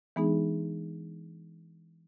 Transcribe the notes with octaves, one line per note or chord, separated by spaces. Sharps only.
E3 G#3 B3 D4 D#4 G#4